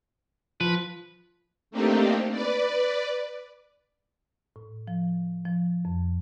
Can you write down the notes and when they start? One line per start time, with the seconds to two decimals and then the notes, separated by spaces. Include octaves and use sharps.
0.61 F3 B4
1.71 A3 A#3 C4 D4 D#4 G4
2.31 B4 D5
4.56 A2
4.88 F3
5.45 F3
5.85 F2